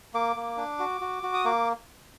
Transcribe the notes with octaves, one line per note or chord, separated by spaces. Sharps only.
A#3 D6
A#3
D4
F#4
F#4
F#4
D#6
A#3 D6